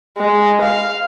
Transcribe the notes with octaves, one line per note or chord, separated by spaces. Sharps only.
G#3
F5